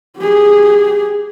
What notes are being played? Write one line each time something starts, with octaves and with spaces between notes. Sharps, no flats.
G4 G#4